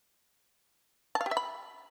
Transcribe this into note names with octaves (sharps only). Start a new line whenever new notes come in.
A5
F5
G4
E5
B5